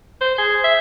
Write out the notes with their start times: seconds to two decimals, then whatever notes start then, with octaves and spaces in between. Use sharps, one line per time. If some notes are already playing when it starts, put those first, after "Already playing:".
0.21 C5
0.38 G#4
0.64 E5